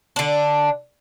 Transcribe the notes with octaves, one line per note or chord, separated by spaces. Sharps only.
D3 D4